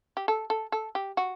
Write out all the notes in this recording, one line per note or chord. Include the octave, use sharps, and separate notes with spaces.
G4
A4
A4
A4
G4
F#4